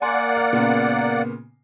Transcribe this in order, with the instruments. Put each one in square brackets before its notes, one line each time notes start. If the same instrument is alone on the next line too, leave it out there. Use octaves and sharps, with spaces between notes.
[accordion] A#3 D5 F#5 [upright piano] G#5 C6
[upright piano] F5
A#2 C#3 B3